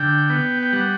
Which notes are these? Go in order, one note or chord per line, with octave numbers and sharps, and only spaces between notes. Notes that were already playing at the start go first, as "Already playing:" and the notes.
Already playing: D3 G5
B3
G5
G3 F#5